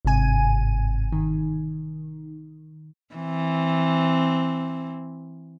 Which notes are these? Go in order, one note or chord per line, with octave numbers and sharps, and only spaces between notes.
G1 G#2 C3 G#5 D#7
D#3
E3 C4